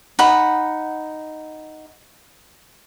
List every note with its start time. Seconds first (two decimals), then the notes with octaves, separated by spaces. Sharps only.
0.19 D#4 F#5 B5